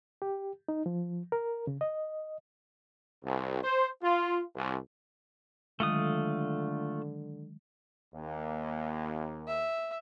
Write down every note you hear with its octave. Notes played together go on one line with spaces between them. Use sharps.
G4
D#4
F3
A#4
C#3
D#5
C2
C5
F4
C2
D3 D#3 F#3 G#3 A3 F4 D#6
D#2 A#3
E5